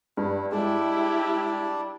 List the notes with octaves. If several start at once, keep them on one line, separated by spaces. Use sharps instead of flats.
G2 E4
G3 G#3 D4 E4 G4 D5